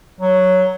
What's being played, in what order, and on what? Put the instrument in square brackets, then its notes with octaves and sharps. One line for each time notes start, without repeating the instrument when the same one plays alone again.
[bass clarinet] F#3